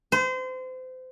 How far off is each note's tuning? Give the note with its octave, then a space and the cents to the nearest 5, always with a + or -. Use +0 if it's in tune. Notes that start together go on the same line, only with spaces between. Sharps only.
C5 -30